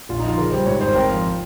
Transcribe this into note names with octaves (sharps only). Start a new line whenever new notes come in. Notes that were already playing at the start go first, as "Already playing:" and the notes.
A#1 F4
D#4
F3 F4
C#3 A#4
G3 C5
G#2 C#5
G#1 C5
C4 A#4
F3